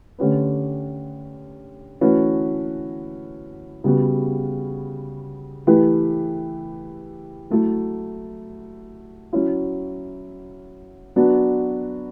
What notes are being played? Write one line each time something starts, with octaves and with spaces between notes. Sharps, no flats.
D3 A3 C#4 G4 B4
E3 A3 C#4 F#4 B4
C#3 G3 B3 F#4
E3 A3 E4 G4 B4
F#3 A3 E4
F#3 C#4 E4
F#3 B3 D4 F#4